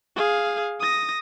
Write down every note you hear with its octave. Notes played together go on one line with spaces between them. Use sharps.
G#4 F5
D#6 A#6